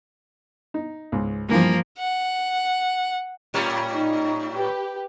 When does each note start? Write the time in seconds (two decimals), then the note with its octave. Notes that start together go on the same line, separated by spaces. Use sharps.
0.74 D#4
1.12 C#2 G#2
1.49 G2 E3 F3 A#3 A#4
1.98 F#5
3.54 A2 G3 C#4
3.94 D#4
4.55 G4 B4